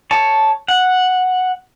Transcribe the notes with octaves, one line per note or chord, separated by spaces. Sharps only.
C#5 A5
F#5